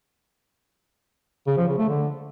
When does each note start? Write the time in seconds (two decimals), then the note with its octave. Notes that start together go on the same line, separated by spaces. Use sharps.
1.47 C#3
1.57 F3
1.68 C#3
1.78 A3
1.89 D3